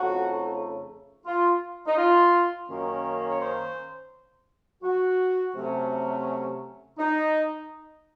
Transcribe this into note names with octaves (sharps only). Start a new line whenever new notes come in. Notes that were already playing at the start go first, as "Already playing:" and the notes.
Already playing: F2 C#3 A3 D#4 F#4
F4
D#4
F4
F#2 D#3 A#3 C#4
C#5
C5
F#4
C3 F#3 A3 C#4
D#4